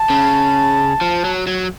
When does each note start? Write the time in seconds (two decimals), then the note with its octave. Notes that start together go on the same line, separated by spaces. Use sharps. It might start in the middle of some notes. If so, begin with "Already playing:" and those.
Already playing: A5
0.10 C#3
1.01 F3
1.25 F#3
1.47 F#3